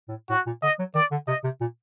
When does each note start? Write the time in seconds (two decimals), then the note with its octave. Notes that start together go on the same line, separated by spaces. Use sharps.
0.08 A2
0.29 A2 F#4
0.46 A#2
0.62 D3 D#5
0.79 F#3
0.95 D#3 D5
1.11 D3
1.27 C3 D#5
1.44 C3
1.61 A#2